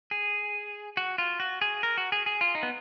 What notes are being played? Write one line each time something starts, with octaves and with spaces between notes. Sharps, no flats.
G#4
F#4
F4
F#4
G#4
A#4
F#4
G#4
G#4
F4
D#4
B3